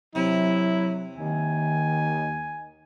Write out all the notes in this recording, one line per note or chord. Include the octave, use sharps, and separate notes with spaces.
C3 F#3 E4
D#2 D#3 G#5